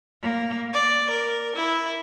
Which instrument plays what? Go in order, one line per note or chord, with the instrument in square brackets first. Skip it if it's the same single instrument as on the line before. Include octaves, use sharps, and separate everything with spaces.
[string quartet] A#3
D5
A#4
E4